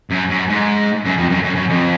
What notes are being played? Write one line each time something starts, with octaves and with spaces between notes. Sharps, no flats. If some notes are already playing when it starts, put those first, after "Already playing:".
F#2
F#2
G#2
F#2
F2
F#2
F#2
F#2
F2